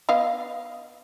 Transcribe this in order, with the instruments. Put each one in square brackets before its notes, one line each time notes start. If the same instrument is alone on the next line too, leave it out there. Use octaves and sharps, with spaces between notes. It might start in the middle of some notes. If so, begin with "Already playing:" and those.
[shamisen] B3 D#5 F5